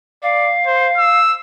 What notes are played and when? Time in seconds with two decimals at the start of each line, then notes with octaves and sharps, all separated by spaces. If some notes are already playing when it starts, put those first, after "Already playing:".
0.23 D5 F5
0.66 C5
0.98 E6